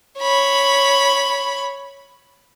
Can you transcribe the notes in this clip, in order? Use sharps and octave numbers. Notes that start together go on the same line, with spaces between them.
C#5 B5